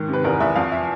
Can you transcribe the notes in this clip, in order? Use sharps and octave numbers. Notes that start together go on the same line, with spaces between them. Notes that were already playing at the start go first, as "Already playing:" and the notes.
Already playing: G#2 D#3
C3
B4
E2 A#4
E2 E5
F2 F5
E5